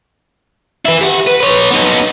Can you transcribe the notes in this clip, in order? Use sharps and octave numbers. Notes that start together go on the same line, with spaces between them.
E4 B4
G4 F#5
B4
B4 C#5
B3 D#4